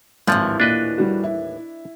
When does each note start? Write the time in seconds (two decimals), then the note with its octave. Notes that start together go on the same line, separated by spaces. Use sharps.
0.27 G#1 D#2 A2 D3 E3 F3
0.60 A#2 D4 B4 D#5
0.98 G3 F#4
1.24 E4